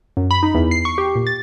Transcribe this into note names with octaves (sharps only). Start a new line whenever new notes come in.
F#2
B5
D#4
E2
C7
C#6
G4
A#2
A6